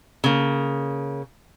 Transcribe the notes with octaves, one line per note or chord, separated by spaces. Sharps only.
C#3 A#3